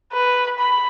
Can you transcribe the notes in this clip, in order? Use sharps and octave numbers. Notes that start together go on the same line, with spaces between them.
B4
B5